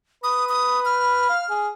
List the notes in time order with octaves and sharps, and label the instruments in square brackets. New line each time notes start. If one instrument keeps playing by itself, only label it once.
[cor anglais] B4 [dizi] D#6
[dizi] D#6
F6
[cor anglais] F5
G#4